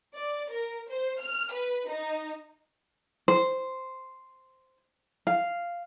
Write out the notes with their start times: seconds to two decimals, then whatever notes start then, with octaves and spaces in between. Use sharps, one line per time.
0.15 D5
0.51 A#4
0.89 C5
1.21 F6
1.52 B4
1.89 D#4
3.28 C5
5.27 F5